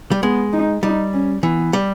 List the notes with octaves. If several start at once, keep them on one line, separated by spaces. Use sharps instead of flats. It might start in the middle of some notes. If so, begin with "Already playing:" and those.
G3
G#3 B3
D#4
G3 D#4
C#4
E3 B3
G3